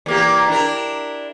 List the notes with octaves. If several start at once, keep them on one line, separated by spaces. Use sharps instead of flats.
E2 A#3 G4
D4 E4 A#4